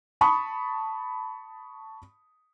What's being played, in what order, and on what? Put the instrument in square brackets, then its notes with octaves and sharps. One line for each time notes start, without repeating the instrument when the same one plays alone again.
[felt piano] A5 B5 C#6 D#6